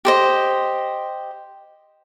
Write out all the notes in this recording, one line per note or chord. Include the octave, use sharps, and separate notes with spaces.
G4 C5 D#5